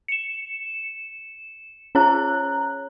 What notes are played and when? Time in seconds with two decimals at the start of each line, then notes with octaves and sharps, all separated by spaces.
0.08 C#7 E7
1.95 C#4 G#4 C#5 A#5 F#6